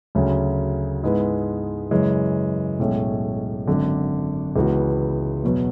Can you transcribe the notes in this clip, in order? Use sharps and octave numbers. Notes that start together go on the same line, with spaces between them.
D2 C#3 F#3 C#4
G#2 G#3 B3 E4 B4
F#2 C#3 E3 G#3 C#4
B1 A2 G#3 C#4
G#1 F#2 D3
C#2 C#3 E3 B3 F#4
E2 B2 F#3 B3